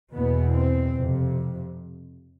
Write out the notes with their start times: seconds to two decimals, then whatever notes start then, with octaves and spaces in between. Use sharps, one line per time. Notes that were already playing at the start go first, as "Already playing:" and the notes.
0.13 E2 B2 B3
0.53 C4
0.94 F2 C3